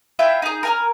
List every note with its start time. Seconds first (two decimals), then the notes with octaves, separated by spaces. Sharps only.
0.19 E4 F4 E5 G5
0.42 D#4 G#4
0.63 A#4 G#5 F6